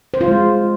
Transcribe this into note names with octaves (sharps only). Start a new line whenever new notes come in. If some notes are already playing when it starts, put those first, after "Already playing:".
C5
F4
G#3